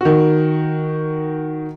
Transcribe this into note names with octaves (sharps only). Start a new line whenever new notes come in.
D#3 F#4